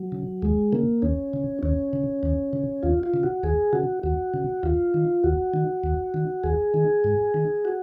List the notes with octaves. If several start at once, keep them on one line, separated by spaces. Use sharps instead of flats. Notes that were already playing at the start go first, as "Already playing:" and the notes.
Already playing: F#3
C#3
D#2 G#3
C#3 A#3
D#2 C#4
C#3
D#2 C#4
C#3
D#2
C#3
D#2 F4
F4
C#3
F#4
D#2 G#4
C#3 F#4
D#2 F#4
C#3
D#2 F4
D#3
D#2 F#4
D#3
D#2
D#3
D#2 G#4
D#3
G#2
D#3
F#4